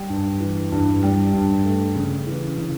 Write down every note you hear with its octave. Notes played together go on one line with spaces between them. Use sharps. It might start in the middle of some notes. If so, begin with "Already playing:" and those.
Already playing: G3
G2
E3
G2
G3
G2
A3
C#3
E3
C#3